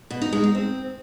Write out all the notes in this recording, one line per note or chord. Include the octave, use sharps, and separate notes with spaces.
B2
D#4
G#3
D#4
C4